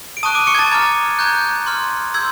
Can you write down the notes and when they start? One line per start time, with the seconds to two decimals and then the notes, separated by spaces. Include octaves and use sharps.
0.17 D7
0.23 A5 C#6 D#6 F#6 D#7
0.35 D6 D7
0.47 C#6 C#7
0.55 G#6
0.59 A5 A6
0.71 A#5 D6 F6 G#6
1.19 A#5 C#6 F#6 G6
1.26 G#6
1.33 G6
1.66 C6 F6
2.14 C6 E6 G6 G#6